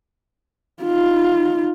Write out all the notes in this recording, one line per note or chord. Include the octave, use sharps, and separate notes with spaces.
D#4 F4